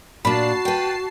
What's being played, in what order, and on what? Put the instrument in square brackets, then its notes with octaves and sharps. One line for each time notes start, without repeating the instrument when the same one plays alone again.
[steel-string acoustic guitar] A#2 D4 [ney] F#4 [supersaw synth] A5 C7 [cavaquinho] B5
[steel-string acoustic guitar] B4 G5